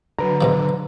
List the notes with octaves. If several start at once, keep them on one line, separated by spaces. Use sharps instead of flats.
D3 F#3 B4 A#5
G#2 B2 F3